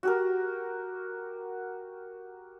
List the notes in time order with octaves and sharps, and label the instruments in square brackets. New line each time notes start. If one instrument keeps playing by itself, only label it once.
[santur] F#4 G4 A#4